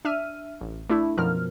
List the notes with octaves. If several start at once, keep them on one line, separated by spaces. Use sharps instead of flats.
D4 E5 F6 D#7
A1
A3 D4 E4
F#2 B2 F3 A#4 F6